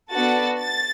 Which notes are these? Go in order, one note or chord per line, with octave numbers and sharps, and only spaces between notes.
B3 D4 F#4 A4 A6
A6